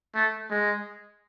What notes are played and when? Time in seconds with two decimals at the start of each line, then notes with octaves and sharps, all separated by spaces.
0.15 A3
0.50 G#3